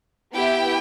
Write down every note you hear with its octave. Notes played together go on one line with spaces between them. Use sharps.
B3 E4 G4 G5